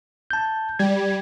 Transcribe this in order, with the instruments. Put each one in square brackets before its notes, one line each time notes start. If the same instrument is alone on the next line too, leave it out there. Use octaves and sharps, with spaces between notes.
[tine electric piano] A5 G6
[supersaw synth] G3 [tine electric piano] G#6